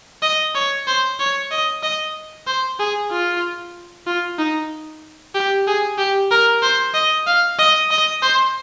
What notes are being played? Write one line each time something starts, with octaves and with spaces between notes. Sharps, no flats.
D#5
C#5
C5
C#5
D#5
D#5
C5
G#4
F4
F4
D#4
G4
G#4
G4
A#4
C5
D#5
F5
D#5
D#5
C5